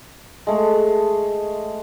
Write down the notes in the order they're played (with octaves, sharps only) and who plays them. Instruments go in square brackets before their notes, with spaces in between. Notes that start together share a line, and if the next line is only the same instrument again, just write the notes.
[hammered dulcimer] G#3 A3